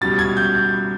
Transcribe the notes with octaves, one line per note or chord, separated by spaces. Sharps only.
C#2 B2 G3 A6
G#6
G6